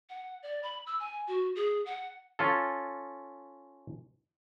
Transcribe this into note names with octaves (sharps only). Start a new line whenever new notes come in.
F#5
D5
B5
E6
G#5
F#4
G#4
F#5
C#4 F4 A4